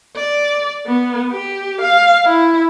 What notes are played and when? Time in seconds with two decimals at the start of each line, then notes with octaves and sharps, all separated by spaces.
0.16 D5
0.87 B3
1.31 G4
1.81 F5
2.25 E4